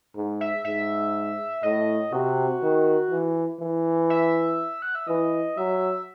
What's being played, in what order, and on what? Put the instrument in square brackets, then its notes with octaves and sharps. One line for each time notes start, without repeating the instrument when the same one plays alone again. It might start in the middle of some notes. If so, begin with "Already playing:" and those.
[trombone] G#2
[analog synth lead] E5
[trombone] G#2 [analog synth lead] E5
[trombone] A2 [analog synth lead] D#5
[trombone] C3 [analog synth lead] F#4
[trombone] D#3
E3
E3
[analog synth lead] E5
F#5
E5
[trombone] E3 [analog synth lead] D#5
[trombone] F#3 [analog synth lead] E5